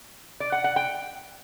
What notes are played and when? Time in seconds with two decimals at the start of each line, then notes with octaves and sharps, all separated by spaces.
0.40 D5
0.52 F#5
0.64 F#5
0.76 G5